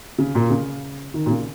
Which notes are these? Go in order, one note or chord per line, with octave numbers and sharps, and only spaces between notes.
C#3
A#2
C#3
D#3
A#2
C#3